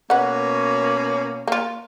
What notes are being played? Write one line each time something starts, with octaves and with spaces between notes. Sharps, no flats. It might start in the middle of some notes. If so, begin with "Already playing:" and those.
B2 A#3 C#4 B4 F#5
A#3 F4